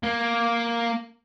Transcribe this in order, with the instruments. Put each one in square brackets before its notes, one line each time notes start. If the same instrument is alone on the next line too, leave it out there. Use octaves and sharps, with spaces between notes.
[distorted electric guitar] A#3